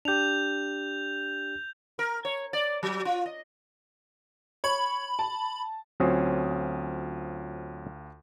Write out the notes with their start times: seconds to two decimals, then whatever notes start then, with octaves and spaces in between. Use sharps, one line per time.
0.05 D4 G4 G6 F7
1.99 A#4
2.25 C#5
2.53 D5
2.83 F#3
3.05 F4
3.26 D#5
4.64 C#5 B5
5.19 A5
6.00 D2 F#3 C4 C#4 F4 D#6